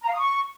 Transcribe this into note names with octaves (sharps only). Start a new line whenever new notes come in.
A#5
F5
D#6
C#6